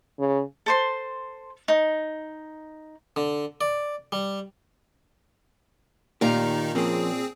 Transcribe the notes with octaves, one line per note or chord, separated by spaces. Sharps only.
C#3
A4 C5 C6
D#4
D3
D5
G3
A#2 D#3 D#4 G4 F5 A#5
F3 A#3 C4 C#4 G#4